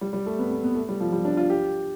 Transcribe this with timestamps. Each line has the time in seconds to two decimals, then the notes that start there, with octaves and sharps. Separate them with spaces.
0.01 G3
0.13 G3
0.26 A3
0.39 B3
0.51 B3
0.64 B3
0.75 A3
0.89 G3
1.00 F3
1.12 G3
1.25 D4
1.37 F4
1.50 G4